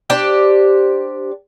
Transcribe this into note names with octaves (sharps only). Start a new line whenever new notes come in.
D4 G4 C5